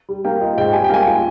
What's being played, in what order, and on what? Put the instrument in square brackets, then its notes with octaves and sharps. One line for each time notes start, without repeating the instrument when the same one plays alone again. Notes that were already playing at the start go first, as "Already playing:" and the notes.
[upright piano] G3
[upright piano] A#3 [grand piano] G5
[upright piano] F4 [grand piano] D#5
[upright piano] G#2 [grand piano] G5
[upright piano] G3 [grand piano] G#5
[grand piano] G5
[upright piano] A#3 [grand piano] G#5
[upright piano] F4